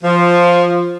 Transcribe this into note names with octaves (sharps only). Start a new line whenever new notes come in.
F3